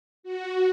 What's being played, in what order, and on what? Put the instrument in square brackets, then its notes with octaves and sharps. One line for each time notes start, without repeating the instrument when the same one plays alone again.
[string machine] F#4